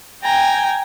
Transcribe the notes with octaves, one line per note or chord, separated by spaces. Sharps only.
G5 G#5 A#5